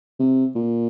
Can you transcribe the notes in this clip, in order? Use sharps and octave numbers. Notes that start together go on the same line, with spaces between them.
C3
A#2